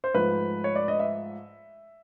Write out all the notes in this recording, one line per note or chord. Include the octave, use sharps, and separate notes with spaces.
C5
G#2 F3 A3 B4
C#5
D5
D#5
E5